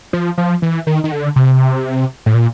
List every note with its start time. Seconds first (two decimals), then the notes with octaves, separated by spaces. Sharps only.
0.13 F3
0.38 F3
0.62 E3
0.87 D#3
1.04 D#3
1.12 D3
1.36 C3
2.26 A2
2.34 A#2